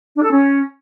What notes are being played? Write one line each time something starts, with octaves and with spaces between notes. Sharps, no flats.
D4
A4
C#4